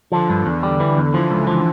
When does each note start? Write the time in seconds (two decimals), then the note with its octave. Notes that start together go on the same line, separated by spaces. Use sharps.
0.12 D3 F3
0.30 G2
0.46 E2
0.63 G3
0.80 E3
0.97 E2
1.13 E3 F3
1.30 C#2
1.47 F3